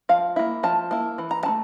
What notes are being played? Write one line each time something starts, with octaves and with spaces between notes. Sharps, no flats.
F3 F5
A#3 E4
F3 A5
A#3 E4
E3
A#5
A3 E4 A5